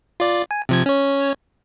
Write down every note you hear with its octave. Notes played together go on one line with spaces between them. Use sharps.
F4 D5
G#5
C3 F3 G#6
C#4 C#5